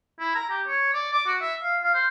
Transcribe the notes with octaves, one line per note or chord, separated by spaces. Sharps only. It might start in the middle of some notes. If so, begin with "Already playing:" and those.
E4
A#5
G4
C#5
D5
D6
F#4
E5
F5
F5
C5